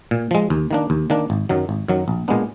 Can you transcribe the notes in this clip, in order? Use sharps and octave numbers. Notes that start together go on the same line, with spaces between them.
A#2
F3 G#3
D#2
D#3 A#3 D4
D#2
D#3 A#3 D4
G#1
F#2 D#3 F#3
G#1
F#2 D#3 F#3
A#1
A#2 G#3 B3 D4